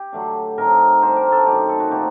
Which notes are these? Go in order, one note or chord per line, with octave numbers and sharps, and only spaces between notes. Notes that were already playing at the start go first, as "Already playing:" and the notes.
Already playing: G4
D3 F#3 A3 D4
A2 A3 C4 D#4 A#4
D3 G3 D4 C5
A#4
A4
F#2 D#3 A3 D#4 G4
A4
F#4
A#2 A3 C4 D#4 G4